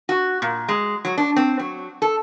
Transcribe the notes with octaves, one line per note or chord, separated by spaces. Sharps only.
F#4
A#2
G#3
F#3
D4
C4
F#3
A4